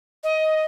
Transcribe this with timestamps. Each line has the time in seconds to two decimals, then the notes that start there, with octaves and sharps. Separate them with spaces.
0.23 D#5